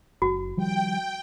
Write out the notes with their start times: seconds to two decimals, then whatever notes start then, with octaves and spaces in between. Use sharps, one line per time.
0.22 F#1 F#4
0.57 D#3 F3 G3 G5